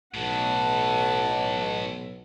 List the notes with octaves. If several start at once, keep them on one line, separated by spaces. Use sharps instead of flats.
B1 A2 E3 F#5 A5